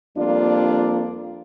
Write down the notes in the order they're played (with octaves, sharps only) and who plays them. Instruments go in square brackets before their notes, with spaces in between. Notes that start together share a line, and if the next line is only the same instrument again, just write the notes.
[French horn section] F2 G3 A#3 D4 F4 D5